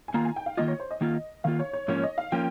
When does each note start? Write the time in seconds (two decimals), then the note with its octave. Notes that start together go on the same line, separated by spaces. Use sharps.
0.08 G#5
0.14 D#3 A#3 F4 A#5
0.25 G#5
0.36 G5
0.46 F5
0.57 D#3 A#3 F4 D#5
0.68 C#5
0.80 C5
0.91 D#5
1.01 D#3 A#3 F4
1.44 D#3 A#3 F4 F5
1.59 C#5
1.73 C#5
1.88 G#2 F3 A#3 C#4 C#5
2.03 D#5
2.18 F5
2.32 F3 A#3 C#4 G5